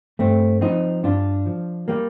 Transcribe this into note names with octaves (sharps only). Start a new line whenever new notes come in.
G2 A3 C4
F3 C4 D#4
G2 D4 F4
F3
G3 A#3